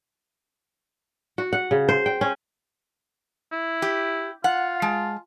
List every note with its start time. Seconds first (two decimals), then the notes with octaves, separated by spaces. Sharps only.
1.38 F#4
1.53 F#5
1.71 C#3
1.89 C5
2.06 G5
2.21 C#4
3.52 E4
3.82 G4
4.44 F4 F#5
4.82 G#3 A5